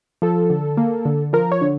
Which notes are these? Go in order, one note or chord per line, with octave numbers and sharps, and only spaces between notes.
F3 A4
D3
A#3
D3
F3 A#4
C#5
D3